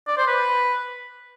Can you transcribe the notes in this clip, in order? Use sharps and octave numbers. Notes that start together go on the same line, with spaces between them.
D5
C5
B4